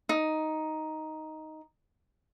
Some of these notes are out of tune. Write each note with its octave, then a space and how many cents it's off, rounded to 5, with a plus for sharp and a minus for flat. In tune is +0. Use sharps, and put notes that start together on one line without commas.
D#4 +5